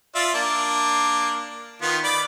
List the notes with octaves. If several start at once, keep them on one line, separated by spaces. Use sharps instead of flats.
F4 D5 E5
A#3 D4
D#3 B3 F4
D5 B5 D6